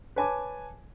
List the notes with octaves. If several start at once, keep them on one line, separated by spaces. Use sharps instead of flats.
B4 C#5 G#5 A5 D6